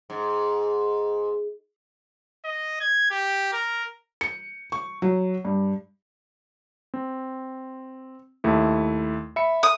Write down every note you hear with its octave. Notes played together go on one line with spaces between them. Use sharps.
G#2
D#5
G#6
G4
A#4
C#7
C#6
F#3
G2
C4
D#2 A3 E4
E5 B5 C#7
D#6